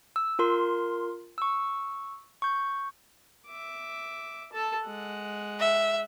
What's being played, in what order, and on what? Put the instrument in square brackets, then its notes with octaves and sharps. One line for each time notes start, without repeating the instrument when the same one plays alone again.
[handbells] E6
F4 A#4 C6
C#6 E6
C#6 G6
[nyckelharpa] E5 D6
A4 A5
G#3 F#5
[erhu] E5